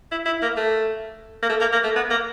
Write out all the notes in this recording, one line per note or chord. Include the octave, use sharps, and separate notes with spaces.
E4
E4
A#3
A3
A#3
A3
A#3
A#3
A3
B3
A#3